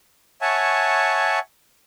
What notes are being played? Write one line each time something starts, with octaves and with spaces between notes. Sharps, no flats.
C#5 E5 F#5 G#5 A5 C#6